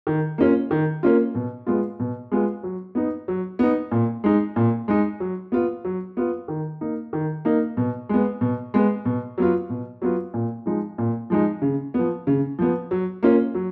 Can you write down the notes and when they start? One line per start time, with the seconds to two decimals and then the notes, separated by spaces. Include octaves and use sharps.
0.07 D#3
0.38 A#3 C#4 F4
0.71 D#3
1.03 A#3 C#4 F4
1.35 B2
1.67 G#3 B3 F4
1.99 B2
2.32 G#3 B3 F4
2.63 F#3
2.95 B3 D#4
3.28 F#3
3.59 B3 D#4
3.91 A#2
4.24 G#3 D#4
4.56 A#2
4.88 G#3 D#4
5.20 F#3
5.52 B3 F4
5.85 F#3
6.17 B3 F4
6.48 D#3
6.81 A#3 D#4
7.13 D#3
7.45 A#3 D#4
7.77 B2
8.09 G#3 B3
8.41 B2
8.74 G#3 B3
9.05 B2
9.38 F#3 B3 F4
9.70 B2
10.02 F#3 B3 F4
10.34 A#2
10.66 F3 G#3 D#4
10.98 A#2
11.30 F3 G#3 D#4
11.62 C#3
11.94 F3 B3
12.27 C#3
12.59 F3 B3
12.91 F#3
13.23 A#3 C#4 F4
13.54 F#3